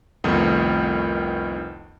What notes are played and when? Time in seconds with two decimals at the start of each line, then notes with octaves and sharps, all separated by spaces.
0.24 C2 F2 D#3 A3 B3 D#6